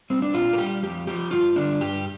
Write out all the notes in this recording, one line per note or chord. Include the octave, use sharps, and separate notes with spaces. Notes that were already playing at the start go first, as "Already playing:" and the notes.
G3 C4
D4
A#2 F4
A#4
G3 G4
F2 G4
F3 G4
G2 F4
D3 G3 D4
G2 G4